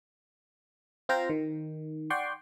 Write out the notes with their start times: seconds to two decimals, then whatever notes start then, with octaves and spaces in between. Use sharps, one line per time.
1.09 C4 F4 C5 G5 A#5
1.30 D#3
2.10 D5 F#5 G5 C6 C#6